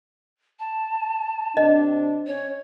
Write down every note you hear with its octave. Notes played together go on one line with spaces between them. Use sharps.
A5
C3 C4 D4 D#5
C#4 C#5